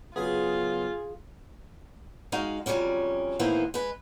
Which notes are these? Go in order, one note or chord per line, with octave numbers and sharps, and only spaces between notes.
C#3 F#3 B3 F4 G#4
G#3 D#4 F#4 F5
F2 C#3 F#3 G3 C#4
A2 D#3 E3 A#3 B3 C5
G#3 B4